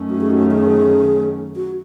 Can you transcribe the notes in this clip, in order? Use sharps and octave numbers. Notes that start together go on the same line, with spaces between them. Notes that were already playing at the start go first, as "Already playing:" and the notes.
Already playing: F#2 D#3 A3 C#4
F#4
G#4
F#4
G#4
F#4